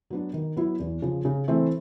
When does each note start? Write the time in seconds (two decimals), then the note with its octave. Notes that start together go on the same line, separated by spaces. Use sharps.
0.10 F#3 B3 D4
0.33 D#3
0.56 F#3 B3 E4
0.79 E2
1.02 C#3 F3
1.25 C#3
1.48 E3 A3 C4